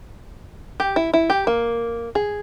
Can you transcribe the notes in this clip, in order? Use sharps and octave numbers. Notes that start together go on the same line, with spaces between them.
G4
E4
E4
G4
A#3
G#4